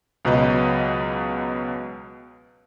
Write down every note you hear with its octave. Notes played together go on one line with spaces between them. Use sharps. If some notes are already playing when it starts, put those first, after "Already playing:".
C#2 B2 F#3 B4 D#5